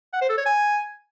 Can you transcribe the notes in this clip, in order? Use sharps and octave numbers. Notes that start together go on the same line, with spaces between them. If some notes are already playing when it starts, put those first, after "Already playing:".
F#5
C5
A4
C#5
G#5